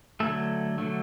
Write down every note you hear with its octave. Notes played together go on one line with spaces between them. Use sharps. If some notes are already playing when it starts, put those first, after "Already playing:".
D3 F#3 A3 A4
D3 F#3 A3